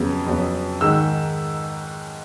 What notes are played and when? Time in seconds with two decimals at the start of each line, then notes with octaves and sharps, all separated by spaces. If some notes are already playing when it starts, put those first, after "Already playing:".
Already playing: F2 C#3 F#3 B3
0.26 F2 C#3 F#3 B3
0.80 G#2 D#3 G#3 E6